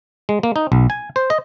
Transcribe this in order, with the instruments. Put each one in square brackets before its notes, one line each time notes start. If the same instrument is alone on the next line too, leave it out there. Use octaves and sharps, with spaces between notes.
[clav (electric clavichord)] G#3
A#3
D#4
B1
G#5
C5
D#5